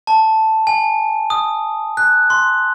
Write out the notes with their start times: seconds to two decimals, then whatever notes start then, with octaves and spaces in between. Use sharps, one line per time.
0.07 A5
0.67 G#5
1.30 D#6
1.97 F#6
2.30 C6